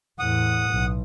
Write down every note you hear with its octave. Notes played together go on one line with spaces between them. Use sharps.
E2 A2 F#5 D#6
B1